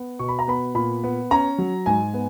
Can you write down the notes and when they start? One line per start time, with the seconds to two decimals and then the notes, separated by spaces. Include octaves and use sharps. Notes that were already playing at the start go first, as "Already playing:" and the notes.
Already playing: B3
0.19 B2 C#6
0.28 B5
0.39 A#5
0.48 B3 B5
0.75 A#2 B5
1.03 B3
1.31 C#4 A#5
1.58 F#3
1.86 G#2 G#5
2.14 B3